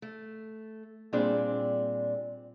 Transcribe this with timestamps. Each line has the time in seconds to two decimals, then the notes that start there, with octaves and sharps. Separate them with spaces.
0.02 A3
1.13 A#2 G3 C4 D4 G#4 D5